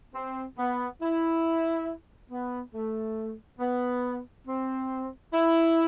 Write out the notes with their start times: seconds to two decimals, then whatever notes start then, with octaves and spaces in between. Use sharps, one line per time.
0.14 C4
0.57 B3
1.01 E4
2.29 B3
2.72 A3
3.59 B3
4.46 C4
5.32 E4